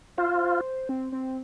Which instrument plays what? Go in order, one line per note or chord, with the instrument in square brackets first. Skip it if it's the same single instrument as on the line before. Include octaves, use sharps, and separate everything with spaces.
[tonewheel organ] F4 [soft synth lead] C5
[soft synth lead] C4
C4